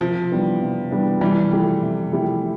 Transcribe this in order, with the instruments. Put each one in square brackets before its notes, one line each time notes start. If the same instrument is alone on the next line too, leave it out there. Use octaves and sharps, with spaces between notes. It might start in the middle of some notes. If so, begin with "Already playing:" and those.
[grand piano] C3 [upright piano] F3
[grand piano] E3 G3 B3 D4
C3
E3 G3 B3 D4
[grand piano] C3 [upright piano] E3 G3
[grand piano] F3 A3 E4 G4
C3
F3 A3 E4 G4